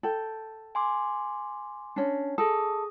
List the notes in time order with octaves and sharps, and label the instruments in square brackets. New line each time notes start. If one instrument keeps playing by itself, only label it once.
[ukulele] A4 G5
[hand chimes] G#5 C6 D6
[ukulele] C#4 D4
[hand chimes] G#4 D#6 [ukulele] A4